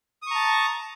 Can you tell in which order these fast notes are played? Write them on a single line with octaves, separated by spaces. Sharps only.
D#6 C#6 A#5 A5